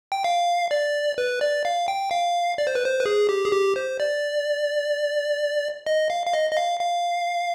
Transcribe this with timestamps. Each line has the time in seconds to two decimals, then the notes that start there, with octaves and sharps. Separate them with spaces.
0.12 G5
0.24 F5
0.71 D5
1.18 B4
1.41 D5
1.65 F5
1.88 G5
2.11 F5
2.58 D5
2.67 C5
2.75 B4
2.85 C5
3.00 B4
3.06 G#4
3.29 G4
3.45 G#4
3.52 G4
3.76 C5
4.00 D5
5.87 D#5
6.10 F5
6.26 F5
6.33 D#5
6.51 D#5
6.57 F5
6.80 F5